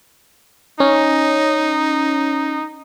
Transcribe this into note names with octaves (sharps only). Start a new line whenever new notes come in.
C#4 D#4